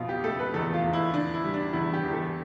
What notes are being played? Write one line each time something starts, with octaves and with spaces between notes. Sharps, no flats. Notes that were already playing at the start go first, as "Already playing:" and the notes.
Already playing: F2 B2 F4
G4
A3 A4
B4
E2 A4
F4
E2
E4
D3 D4
E4
G3
D4
E2 E4
G4
E2
A4